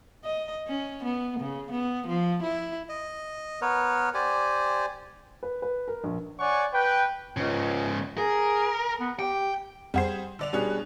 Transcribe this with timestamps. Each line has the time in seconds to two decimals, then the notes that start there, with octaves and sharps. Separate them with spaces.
0.25 D#5
0.68 C#4
1.04 B3
1.40 C#3
1.72 B3
2.08 F3
2.43 E4
2.89 D#5
3.61 B3 A#4 B4 C#5
4.14 G4 C5 D5 G#5
5.43 B4
5.62 B4
5.88 A#4
6.04 A#1
6.39 C#5 D5 F#5 G#5 C#6
6.73 B4 G5
7.37 C#2 G#2 C#3
8.18 G#4 A#4
9.00 B3
9.19 G4 G5
9.94 F2 G3 G#4 C5 F#5 C7
10.39 D3 D5 F7
10.53 B2 G3 C#4 D4 G#4 F#6